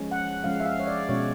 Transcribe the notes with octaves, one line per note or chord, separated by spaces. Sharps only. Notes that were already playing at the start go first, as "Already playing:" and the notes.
Already playing: F3 G#3 C#4
F#5
F3 G#3 C#4 F5
E5
F5
C#5
D5
B2 G#3 C#4 C#5